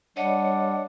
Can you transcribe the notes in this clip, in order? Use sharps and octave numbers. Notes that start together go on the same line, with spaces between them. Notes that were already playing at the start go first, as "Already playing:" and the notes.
G3 D4 C#5 D#5 F#5